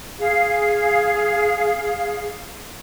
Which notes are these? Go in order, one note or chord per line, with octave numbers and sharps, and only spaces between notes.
G#4 F5